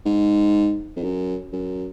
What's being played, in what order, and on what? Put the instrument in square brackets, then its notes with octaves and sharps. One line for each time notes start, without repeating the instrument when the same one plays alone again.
[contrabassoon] G#2
F2
F#2
F#2